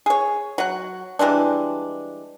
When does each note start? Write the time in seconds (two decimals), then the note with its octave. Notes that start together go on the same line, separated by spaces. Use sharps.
0.06 G#4 C#5
0.58 F#3 F#5
1.19 E3 G3 G#3 D4